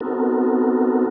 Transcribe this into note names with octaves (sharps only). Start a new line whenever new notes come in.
B3 C4 D#4 F#4 A4 A#4